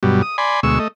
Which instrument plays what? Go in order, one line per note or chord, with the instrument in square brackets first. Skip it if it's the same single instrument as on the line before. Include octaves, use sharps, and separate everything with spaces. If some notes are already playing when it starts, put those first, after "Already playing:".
[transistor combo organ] G2 B2 F#3 G3
D#6
D5 G#5 B5 C6
D2 B2 G#3 C#6 E6
A3 D#5